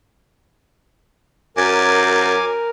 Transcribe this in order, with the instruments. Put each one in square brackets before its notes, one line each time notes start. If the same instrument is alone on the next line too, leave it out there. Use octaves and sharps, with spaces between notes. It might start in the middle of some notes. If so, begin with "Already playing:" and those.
[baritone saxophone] F#2 [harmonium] A#4 [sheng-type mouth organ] G#5 D6